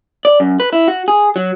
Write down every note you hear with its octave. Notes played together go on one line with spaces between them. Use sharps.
D5
F#2
B4
E4
F#4
G#4
F#3